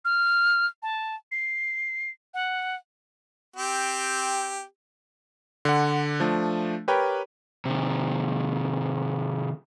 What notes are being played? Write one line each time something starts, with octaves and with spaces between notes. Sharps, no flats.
F6
A5
C7
F#5
C4 G4
D3 F#5
F3 A3 D4
G4 A#4 B4 C#5 G5
C3 D#3